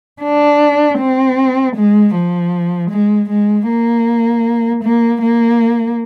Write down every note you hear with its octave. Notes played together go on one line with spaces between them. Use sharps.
D4
C4
G#3
F3
G#3
G#3
A#3
A#3
A#3